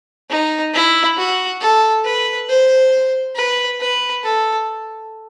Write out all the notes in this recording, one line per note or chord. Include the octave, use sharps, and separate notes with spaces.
D#4
E4
F#4
A4
B4
C5
B4
B4
A4